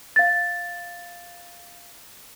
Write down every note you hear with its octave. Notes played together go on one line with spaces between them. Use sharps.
F5 A6